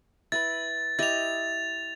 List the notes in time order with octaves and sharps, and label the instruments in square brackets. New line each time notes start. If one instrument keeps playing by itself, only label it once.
[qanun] E4 B4 B5 [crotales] A6
[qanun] E4 G4 D#5 [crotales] A6 F7